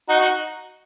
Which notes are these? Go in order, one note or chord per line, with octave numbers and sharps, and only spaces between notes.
D#4 F#4
D#4 F#4